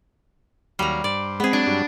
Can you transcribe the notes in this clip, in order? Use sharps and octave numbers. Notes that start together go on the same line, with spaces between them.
D#2 F#3 G3 F5 A#5
G2 C5 D5
G#3 B3 C4 G#4
F#3 D4 G#5
G2 F#3 G3